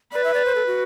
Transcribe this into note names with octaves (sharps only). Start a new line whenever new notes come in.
B4 D5
E5
D5
C5
A4
F#4